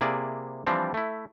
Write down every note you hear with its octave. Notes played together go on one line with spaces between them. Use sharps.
C3 A#3 E4 G#4 D5
E3 F3 G3 C4 D4
A3 E4